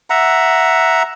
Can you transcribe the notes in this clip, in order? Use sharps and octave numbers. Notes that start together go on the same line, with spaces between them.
E5 F#5 A#5